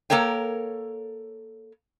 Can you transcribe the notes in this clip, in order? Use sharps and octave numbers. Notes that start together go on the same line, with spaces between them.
A#3 A4 A#4 C#5 G5